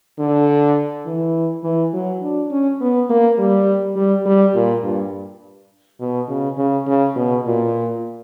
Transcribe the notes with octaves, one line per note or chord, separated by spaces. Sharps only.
D3
E3
E3
F#3
D4
C#4
B3
A#3
G3
G3
G3
A#2
G2
B2
C#3
C#3
C#3
B2
A#2